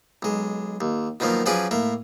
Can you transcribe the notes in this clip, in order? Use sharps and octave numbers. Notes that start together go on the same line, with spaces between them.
B1 G#3
D#2
B2 D#3 F3 F#3 A#3
F3 F#3 C#4 G#4 B4 D5
A2 A#3 E5